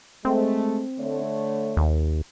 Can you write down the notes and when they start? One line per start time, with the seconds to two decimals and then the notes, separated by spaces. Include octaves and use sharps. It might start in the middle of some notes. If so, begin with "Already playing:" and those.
0.25 G#3 A3 C4
0.99 D3 A3 C#5
1.77 D#2